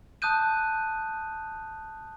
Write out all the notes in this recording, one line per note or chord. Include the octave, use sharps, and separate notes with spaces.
A5 D#6 F#6 G6 D#7